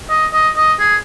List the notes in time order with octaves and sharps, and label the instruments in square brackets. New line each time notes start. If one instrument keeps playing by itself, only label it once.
[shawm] D#5
D#5
D#5
G#4